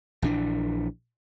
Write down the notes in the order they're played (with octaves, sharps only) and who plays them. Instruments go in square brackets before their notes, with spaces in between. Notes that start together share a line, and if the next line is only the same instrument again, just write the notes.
[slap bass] A#1 E3 D4